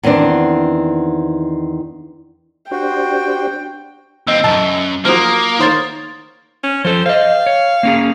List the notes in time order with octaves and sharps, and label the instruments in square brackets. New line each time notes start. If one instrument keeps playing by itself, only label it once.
[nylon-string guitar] E2 D#3 B3 C4 D4
[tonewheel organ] D4 G4 C5 [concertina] F#4 [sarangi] G5
[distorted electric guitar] D#2 C4 [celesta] D#5 E6
[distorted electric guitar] B1 F#2 [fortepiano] A5
[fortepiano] F3 F#3 [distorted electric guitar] A#3 [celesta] D#6 F6
[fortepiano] D#3 C5 C#5 [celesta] D#6 A6
[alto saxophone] C#4
[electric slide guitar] F3 A4 [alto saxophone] C5
[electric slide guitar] C5 D#5 [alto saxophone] F5
[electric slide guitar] C#5
A#3 C#4 G#4